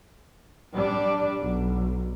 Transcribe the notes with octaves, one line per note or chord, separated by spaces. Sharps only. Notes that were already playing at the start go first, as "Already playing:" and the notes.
G3 D4
B1